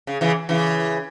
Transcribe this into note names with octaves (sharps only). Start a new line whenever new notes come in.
C#3
C#3 E3
C#3 E3